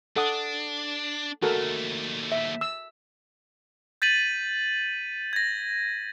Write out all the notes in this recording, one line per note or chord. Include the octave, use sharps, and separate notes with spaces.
D4 A4 F#5 D#6
D#2 A3 F#4 A4 A#4
E5
E6
G6 A6 B6 D#7 F#7
G#6 A#6